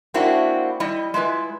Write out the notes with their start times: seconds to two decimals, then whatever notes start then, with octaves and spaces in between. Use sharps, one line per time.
0.14 A#3 C4 D4 E4 F#4
0.80 G3 E4 D#5
1.14 G#3 E4 F4 B4